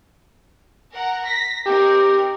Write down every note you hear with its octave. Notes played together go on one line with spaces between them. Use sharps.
A#4 F#5 A#5
A#6 B6
C4 D#4 G4 A#4